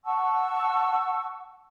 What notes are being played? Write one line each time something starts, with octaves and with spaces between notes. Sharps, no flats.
F#5 A5 C#6 E6